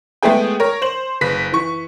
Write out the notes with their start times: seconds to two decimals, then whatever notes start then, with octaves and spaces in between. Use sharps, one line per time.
0.23 G#3 A3 B3 E4 G#4 G5
0.60 A#4 C#5
0.82 C5 F#7
1.21 F#1 B4 B6
1.52 E3 C#6